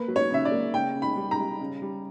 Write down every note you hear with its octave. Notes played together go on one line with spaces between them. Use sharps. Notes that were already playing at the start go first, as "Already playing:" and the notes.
Already playing: A#3 B4
F#3
C#5
C#3 E5
D5
A#3
C#3 G5
C#3
B5
G3
A#5
G3
C#3
G3